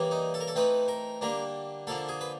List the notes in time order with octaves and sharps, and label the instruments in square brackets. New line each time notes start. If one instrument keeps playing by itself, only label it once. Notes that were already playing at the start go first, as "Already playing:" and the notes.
Already playing: [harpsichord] C#3 E3 G3 A#3
D#4
A4
A#4
A4
E3 A3 C4 D#4 B4
A#4
D3 G3 A#3 D4 A#4
D3 F3 A#3 A4
G#4
B4